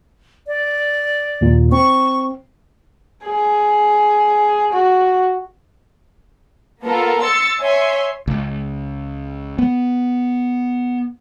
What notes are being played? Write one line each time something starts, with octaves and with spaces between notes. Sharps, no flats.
D5
D#2 A#2
C4 C#6
G#4
F#4
A#3 B3 F4 A4 A#4
C6 E6 A6 C#7
C#5 E5 G#5 C6
C#2
B3